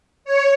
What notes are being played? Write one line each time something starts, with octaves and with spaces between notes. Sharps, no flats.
C#5